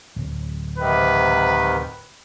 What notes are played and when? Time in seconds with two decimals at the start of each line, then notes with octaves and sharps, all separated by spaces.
0.16 D1
0.78 G#2 C3 D#3 B4